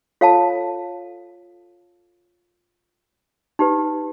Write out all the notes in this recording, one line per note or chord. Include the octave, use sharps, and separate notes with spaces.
F4 A4 C#5 F5 A5
D#4 G4 B4